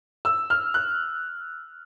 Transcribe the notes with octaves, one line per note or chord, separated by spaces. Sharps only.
E6
F6
F#6